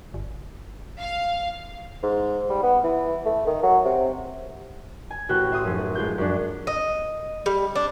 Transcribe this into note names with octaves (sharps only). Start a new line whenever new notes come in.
G1
F5
G#2
G3
B3
E3
A3
D#3
F#3
C3
G#5
A1 F#4 G5 F#6
E5 C6 D#6
F1 F#2
G#3 F4 G6
F#2 D4
D#5
G3
D4